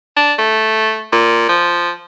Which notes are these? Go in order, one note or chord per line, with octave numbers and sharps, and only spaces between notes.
D4
A3
A#2
F3